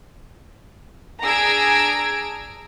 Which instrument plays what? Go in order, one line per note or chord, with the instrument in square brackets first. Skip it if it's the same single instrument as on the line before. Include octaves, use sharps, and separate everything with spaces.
[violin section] D4 G#4 A#5 E6 G#6 D7